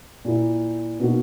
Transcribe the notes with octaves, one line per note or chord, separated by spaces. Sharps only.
A#2 A#3 E4
B2 A#3 D#4 F#4